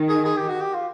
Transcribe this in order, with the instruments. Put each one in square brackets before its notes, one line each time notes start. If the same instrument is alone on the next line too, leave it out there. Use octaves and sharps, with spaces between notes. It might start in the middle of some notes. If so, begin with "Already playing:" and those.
Already playing: [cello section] D#3
[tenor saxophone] G#4
G#4
G4
F#4
G4
F4